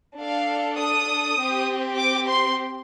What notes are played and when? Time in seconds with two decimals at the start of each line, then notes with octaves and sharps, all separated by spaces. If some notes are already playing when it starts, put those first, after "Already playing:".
0.19 D4 A4 F5
0.79 D#6
1.38 C4 G4
1.97 D6
2.28 C6